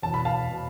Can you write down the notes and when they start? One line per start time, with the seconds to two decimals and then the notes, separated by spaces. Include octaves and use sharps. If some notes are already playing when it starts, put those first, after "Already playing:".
0.02 E2 B2 A5
0.14 B5
0.25 F5 A5
0.49 B2